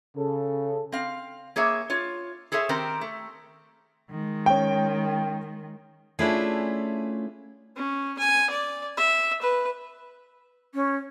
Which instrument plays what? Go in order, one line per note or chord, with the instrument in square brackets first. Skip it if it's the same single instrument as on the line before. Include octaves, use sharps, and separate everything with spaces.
[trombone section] C#3 A4
[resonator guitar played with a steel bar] C4 F5
A#3 G#4 C#5 E5
F4 C#5
G#4 A4 C5 C#5 E5
D#3 C4 G4 A#4 C5
A3
[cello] D#3 G#3
[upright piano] C#4 G5
[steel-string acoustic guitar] A3 C#4 F4 [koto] D4 E4 G#4
[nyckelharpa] C#4
G#5
D5
E5
B4
[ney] C#4